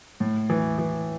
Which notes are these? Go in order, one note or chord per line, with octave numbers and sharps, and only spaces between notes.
A2
E3
E3